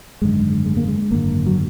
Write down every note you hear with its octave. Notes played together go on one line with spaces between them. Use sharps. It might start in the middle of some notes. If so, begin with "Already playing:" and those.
G#1 F#2 D3 G#3
G#3
A#3
G#3
G#1 F#2 D3 A#3
F#3